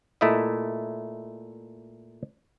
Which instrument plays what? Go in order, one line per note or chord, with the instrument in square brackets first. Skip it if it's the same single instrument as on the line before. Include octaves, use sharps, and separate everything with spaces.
[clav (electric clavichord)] A#2 A3 E4 D#5